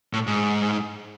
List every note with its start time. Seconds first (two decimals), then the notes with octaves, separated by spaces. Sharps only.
0.13 A2
0.27 G#2